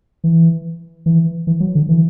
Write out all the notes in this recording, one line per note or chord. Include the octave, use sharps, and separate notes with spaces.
E3
E3
E3
F#3
D3
E3